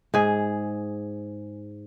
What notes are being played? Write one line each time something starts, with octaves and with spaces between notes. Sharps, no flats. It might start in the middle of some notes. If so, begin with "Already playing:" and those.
G#2 G#4